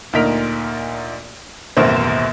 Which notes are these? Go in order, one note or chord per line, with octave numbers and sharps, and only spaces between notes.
D2 A#2 D#4 A#4 B6 F7
D#1 A1 F#2 B2 A#4 C5